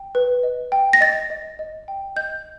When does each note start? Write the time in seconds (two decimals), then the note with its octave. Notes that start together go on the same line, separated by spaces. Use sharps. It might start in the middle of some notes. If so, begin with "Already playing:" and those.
Already playing: G5
0.15 B4
0.43 D#5
0.72 G5
0.93 A#6
1.01 D#5 A6
1.30 D#5
1.59 D#5
1.88 G5
2.16 D#5 G6